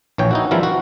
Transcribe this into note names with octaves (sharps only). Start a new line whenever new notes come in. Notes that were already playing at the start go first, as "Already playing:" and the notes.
A#1 E3 C#5 G5
D#4 E4 F#4
E3 F3 G3 C4 E4 A#4
F#4